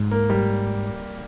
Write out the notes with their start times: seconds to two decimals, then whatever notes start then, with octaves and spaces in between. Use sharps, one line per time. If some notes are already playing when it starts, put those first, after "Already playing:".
Already playing: G#2
0.11 A#3
0.30 G3